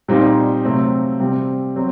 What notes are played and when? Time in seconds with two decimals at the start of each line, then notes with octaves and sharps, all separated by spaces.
0.08 A#2 G3 C4 D#4
0.65 C3 F#3 A3 C4
1.20 C3 G3 C4
1.76 F#3 C4